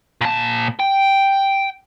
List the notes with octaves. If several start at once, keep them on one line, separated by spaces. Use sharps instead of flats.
A#2 A5
G5